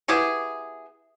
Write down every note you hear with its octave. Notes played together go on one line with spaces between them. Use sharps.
B3 E4 G4 G#4